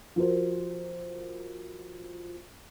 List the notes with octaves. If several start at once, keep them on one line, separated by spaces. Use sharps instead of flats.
F3 F#4 A#4 C5